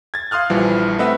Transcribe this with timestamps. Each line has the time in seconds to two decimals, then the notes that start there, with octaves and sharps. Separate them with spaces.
0.14 G#6 A6
0.31 F5 C6 D#6 F6 F#6
0.50 A#1 E3 F3 G3
0.98 A3 C4 B4 D#5 E5 F#5